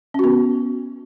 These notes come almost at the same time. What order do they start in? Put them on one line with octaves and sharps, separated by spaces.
C#4 F#4 B3